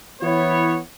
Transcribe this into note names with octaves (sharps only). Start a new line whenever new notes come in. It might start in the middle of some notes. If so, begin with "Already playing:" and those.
E3 B3 E4 C#5